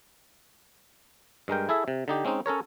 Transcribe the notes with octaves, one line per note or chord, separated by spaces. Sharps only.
G2 G#3 A#4 G5
E4 G#4 A4 E5
C3
D3 D#4 G4
G#3 C4 C#4 D#4
C#4 A4 A#4 C#5